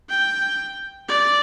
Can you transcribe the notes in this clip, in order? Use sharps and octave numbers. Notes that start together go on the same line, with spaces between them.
G5
D5